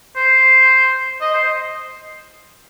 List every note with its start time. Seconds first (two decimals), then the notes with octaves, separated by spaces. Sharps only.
0.16 C5
1.21 D#5
1.34 C5